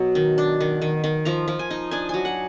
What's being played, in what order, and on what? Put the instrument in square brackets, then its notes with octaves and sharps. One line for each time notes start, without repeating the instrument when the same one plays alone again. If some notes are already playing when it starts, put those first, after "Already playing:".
Already playing: [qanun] B2 F#3
D#3
D4
D#3
D#3
D#3
F3 A#5
F3
G#5
D#4
D4 G#5
F#3 G#5
F#5